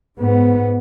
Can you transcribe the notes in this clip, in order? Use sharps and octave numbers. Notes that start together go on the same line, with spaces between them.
G#2 B3